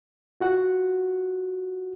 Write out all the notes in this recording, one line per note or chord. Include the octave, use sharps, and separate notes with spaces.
F4 F#4 F#5